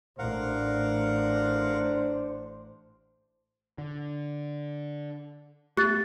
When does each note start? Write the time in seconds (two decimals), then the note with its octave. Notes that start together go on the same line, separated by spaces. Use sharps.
0.19 A1 D4 A#4 C5 F5 F#5
3.78 D3
5.77 A3 B3 G4 F#6 A6